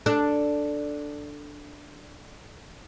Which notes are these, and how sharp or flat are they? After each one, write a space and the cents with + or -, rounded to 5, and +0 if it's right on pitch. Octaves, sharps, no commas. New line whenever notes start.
D4 +0 A4 +5